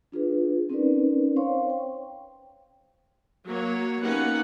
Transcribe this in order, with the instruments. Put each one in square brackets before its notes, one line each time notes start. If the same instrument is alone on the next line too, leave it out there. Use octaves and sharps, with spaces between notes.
[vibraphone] D4 F4 G#4 B4
C4 C#4 D#4 A#4 B4 D5
C5 C#5 F5 C6 C#6
G5
[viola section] F#3 A#3 C#5
A#3 B3 C#4 D#4 G4 F#5